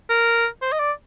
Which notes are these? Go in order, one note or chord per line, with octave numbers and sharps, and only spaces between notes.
A#4
C5
D#5
D5